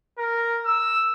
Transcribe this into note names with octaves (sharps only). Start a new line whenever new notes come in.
A#4
E6